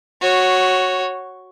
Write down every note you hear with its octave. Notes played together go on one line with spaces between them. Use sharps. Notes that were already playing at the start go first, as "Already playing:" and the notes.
F#4 C#5